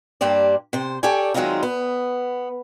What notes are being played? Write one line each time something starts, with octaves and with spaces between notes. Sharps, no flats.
G2 A#3 G4 C5 D5
C3 C5
G4 A4 C#5 D5 G#5
D#3 F#3 G#3 C4 D#4 F4
B3